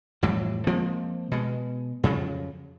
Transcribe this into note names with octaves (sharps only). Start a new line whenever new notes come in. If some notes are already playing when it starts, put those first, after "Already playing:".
F2 A2 E3 G3
F3 G#3 A#3 C4
B2 G#3
F2 C#3 F3 F#3